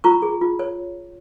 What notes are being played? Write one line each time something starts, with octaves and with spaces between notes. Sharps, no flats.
F4 A#5 C#6
G#4
F4
C#5